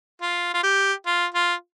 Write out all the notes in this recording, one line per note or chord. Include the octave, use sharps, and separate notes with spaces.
F4
F4
G4
F4
F4